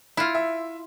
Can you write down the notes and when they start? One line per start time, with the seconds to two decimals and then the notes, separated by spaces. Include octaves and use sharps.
0.17 E4 F4
0.35 E5